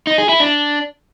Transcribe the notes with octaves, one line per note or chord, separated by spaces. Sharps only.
D#4
G#4
E4
D4